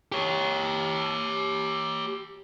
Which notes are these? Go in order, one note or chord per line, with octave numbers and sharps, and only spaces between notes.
G4 C#5